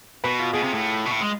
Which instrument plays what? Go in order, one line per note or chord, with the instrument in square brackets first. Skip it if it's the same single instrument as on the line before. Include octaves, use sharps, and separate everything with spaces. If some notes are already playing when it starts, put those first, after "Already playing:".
[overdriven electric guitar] B2 [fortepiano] B4
[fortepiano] F4
[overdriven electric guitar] B2 [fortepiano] G#4
[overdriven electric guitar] C3
A2
B2
A2
G#3